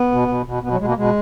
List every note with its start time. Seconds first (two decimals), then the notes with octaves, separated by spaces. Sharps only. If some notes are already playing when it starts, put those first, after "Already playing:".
Already playing: B3
0.11 B2
0.28 B2
0.46 B2
0.63 B2 B3
0.71 F#3
0.80 B2 G#3
0.88 A#3
0.97 B2 G#3